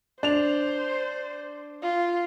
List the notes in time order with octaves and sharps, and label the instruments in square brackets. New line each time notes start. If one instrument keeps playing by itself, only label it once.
[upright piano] D4 F7 [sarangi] C5
[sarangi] F4